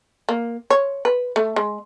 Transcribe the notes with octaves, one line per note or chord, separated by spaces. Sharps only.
A#3
C#5
B4
A3
G#3